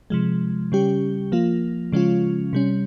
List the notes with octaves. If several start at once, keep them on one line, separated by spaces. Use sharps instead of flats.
C3 F3 G#3
C#3 G3 C#4 G4
F3 A#3 F4
C#3 F3 G#3 C#4 F4
C3 G3 C#4